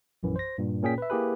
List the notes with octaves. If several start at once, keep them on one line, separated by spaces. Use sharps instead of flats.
A#1 F#2 E3
C5 A#6
G2 A#2
A#2 A#3 C#4 G#4 G5 B6
B4 E5
A#3 E4 G4 G#4 B4